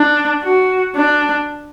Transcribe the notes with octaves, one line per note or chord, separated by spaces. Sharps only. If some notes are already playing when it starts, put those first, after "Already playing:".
Already playing: D4
F#4
D4